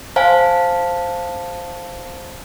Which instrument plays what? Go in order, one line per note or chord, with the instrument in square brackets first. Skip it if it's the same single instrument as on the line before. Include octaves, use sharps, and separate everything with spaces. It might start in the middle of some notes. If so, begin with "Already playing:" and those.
[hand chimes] C5 F5 G#5 A5